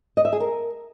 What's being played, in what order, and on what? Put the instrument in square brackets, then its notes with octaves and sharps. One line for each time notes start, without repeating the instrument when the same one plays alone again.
[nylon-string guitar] D#5
E5
G#4
A#4